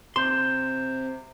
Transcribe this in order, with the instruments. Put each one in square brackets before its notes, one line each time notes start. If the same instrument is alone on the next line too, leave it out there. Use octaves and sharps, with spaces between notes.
[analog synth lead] C3 [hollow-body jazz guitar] C6 [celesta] G6 E7